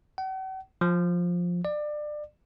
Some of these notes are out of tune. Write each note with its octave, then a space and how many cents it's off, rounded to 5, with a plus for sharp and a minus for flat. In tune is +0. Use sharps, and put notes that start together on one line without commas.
F#5 +45
F3 +10
D5 +25